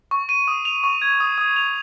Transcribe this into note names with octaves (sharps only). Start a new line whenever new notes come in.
C#6
D#7
D#6
F7
C#6
G#6
D#6
D#6
F7